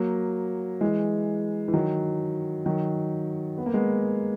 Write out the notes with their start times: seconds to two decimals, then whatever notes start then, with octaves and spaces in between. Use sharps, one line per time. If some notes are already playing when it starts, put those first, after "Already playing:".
Already playing: F#3 A#3
0.81 E3 G#3
1.68 E3
1.73 D#3 F#3
2.66 D#3 F#3
3.58 B3
3.66 A#3
3.74 G#3 B3